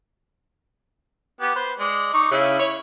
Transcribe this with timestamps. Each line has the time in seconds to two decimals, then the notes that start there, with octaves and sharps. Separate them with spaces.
1.41 B3 G4
1.56 B4 C5
1.79 G#3 D5
2.13 D#4 C#6 D6
2.32 C#3 E4 E6
2.60 C#5